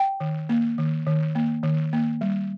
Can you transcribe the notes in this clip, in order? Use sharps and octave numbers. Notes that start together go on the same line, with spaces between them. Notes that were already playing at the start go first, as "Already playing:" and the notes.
Already playing: G5
D#3
A#3
D#3
D#3
A#3
D#3
A#3
G3